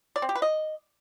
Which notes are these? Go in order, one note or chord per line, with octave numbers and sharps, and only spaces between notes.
D5
C4
G4
B4
D#5